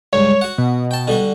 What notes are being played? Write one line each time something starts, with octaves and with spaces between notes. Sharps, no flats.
C#2 G2 C#5
F#4 F#5
B2
G5 A5
D3 G3 F#4